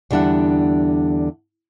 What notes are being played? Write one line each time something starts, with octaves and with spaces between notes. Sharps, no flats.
E2 D3 G3 D4 E5 F#5